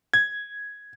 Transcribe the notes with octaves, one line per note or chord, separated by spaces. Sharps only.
G#6